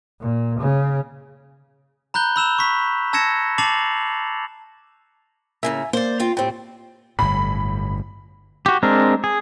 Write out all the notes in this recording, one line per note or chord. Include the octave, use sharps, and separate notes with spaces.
A#2
C#3
A#5 B5 F#6 G6 G7
B5 E6 E7 F7
C#6 B6
A5 E6 G#6 A#6 C#7 E7
A5 D6 A6 C7 F7 F#7
A2 C#3 A#3 E5 G#5
A#3 C5 D5
C4 F4
A2 C4 G4 C5 G5
G1 A2 B5
F#4 G4
G#3 C4 D4 A#4
G#4